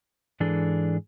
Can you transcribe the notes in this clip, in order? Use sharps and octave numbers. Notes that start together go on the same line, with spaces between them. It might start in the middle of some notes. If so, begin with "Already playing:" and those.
G#2 E3 D4 G#4 A4